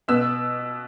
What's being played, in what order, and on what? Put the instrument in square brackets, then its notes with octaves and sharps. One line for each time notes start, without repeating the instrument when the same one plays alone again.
[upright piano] B2 B3 E6